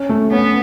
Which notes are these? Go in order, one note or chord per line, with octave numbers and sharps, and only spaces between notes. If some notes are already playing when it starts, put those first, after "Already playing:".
Already playing: C#4
A3
B3 C#4